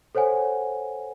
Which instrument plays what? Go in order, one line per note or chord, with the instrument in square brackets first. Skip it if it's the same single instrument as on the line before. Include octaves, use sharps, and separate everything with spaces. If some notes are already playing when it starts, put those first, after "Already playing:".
[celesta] A4 C5 C#5 F#5 G#5